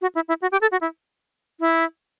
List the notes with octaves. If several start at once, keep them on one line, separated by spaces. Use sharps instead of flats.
F#4
E4
E4
F#4
G4
A4
F#4
E4
E4